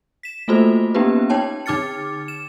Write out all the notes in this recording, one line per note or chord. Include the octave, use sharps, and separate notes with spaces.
B6 E7
A3 A#3 F4 F#4 A4 C5
A#3 B3 C#4 D#4 G4 B4
D#4 C#5 G5 A5
D3 D#4 D6 F6 A6 C#7
E7